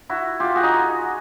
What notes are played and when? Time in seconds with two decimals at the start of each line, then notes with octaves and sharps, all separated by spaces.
0.09 E4 F#4
0.40 F4 G4
0.55 F#4 G#4
0.63 D#4